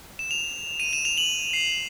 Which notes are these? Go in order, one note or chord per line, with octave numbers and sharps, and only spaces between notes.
E7
F7
D#7
E7
F7
F#7
C7